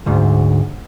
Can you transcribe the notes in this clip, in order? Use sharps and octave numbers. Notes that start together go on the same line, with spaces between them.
D2 G#2